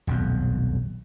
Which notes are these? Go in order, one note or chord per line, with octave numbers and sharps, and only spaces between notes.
D#1 B1 F2